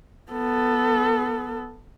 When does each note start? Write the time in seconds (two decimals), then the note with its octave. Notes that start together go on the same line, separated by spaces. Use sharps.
0.32 B3 A4